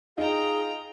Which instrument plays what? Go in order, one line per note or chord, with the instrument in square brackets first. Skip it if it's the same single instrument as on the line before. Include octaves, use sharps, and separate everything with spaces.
[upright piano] D#4 [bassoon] F4 [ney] G#4 [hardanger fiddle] G5 A#5